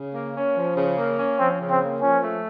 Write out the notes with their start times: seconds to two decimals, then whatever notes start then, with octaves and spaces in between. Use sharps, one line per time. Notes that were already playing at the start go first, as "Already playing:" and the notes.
Already playing: C#3
0.14 A#3
0.36 C#4
0.57 F3
0.77 C#3
0.97 A#3
1.18 C#4
1.39 F3 C4
1.60 C#3
1.70 C4
1.81 A#3
2.02 F3 C#4
2.23 A3